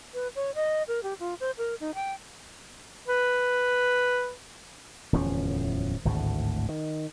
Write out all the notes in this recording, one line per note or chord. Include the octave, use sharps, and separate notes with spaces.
B4
C#5
D#5
A#4
G4
F4
C5
A#4
D#4
G5
B4
D1 E2 F3 C#4
G#1 D2 A2
D#3